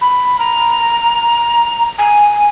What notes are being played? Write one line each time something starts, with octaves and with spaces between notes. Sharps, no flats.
B5
A#5
G#5